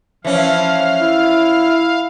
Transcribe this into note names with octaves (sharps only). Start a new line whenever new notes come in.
E3 F3 C#4 F5
E4